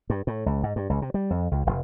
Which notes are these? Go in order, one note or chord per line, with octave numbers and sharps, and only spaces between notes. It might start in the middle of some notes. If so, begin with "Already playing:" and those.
G2
A2
C#2
G#2
G2
C#2
C3
G3
F2
C#2
F1